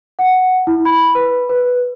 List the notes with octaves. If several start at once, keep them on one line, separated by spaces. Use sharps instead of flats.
F#5
E4
B5
B4
B4